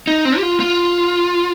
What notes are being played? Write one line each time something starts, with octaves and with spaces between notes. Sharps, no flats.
D#4
C4
G4
F4
F4